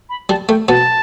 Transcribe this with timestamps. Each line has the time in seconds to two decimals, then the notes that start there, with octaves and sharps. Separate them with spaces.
0.09 B5
0.29 G3 A5
0.48 A3 G5
0.68 B2 B3 A5